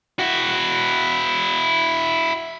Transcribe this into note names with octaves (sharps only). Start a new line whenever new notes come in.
E4 F#4